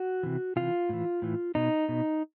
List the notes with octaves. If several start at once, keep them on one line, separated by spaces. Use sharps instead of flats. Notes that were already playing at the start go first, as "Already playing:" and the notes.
Already playing: F#4
C3 E3
C3 E3 F4
A2 E3
A2 E3
B2 D#4
B2